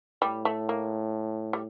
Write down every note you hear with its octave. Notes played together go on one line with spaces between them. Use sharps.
A2 G3
A3
A#3
G3